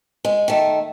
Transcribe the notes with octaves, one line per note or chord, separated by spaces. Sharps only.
G#3
D#3 A3